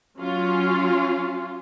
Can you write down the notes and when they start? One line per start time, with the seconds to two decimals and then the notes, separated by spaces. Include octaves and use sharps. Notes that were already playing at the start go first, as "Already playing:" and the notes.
0.18 F#3 C#4 F4